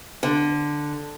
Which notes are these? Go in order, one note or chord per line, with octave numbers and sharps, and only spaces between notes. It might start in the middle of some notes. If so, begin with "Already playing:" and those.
D3